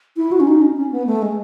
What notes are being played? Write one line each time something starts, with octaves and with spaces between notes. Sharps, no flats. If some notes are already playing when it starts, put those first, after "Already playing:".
E4
F#4
C#4
D#4
C#4
C#4
B3
A3
G#3